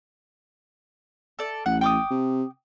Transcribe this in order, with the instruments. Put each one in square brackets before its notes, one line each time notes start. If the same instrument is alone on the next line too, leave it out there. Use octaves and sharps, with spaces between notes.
[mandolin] A4 D5
[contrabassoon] A1 [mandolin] F#5
[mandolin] G5 D6 D#6
[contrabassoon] C3